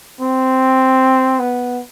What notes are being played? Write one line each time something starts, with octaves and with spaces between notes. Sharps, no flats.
C4
B3